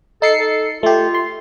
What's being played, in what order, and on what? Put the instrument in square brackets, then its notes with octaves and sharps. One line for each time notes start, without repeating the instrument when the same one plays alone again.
[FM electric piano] D#4 C7 C#7 [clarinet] A4
[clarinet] A4
[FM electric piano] A3 G4 [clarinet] F4
[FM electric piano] C6